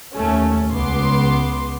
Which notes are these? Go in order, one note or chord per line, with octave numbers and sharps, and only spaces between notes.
D#2 A3 C#4
C#2 B3 C6 D6